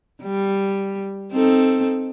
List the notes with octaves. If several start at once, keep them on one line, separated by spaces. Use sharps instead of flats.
G3
C4 D#4 A4